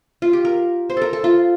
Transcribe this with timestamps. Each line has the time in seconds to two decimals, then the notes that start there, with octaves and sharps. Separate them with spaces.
0.22 F4
0.33 G4
0.45 A#4
0.90 C5
0.97 A4 A#4
1.13 A4
1.24 F4